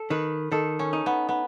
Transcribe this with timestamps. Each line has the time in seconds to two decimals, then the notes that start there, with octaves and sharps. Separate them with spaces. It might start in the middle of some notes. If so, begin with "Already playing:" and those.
Already playing: A4
0.10 D#3 B4
0.52 D#3 A4
0.79 C#4
0.93 D#4
1.06 B3
1.29 B3